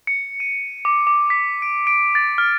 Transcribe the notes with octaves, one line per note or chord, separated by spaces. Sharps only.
C#7
D#7
D6
D6
B6
D7
D7
A6
F6